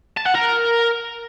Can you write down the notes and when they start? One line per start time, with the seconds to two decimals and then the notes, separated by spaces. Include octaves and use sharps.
0.17 A5
0.26 F#5
0.35 A#4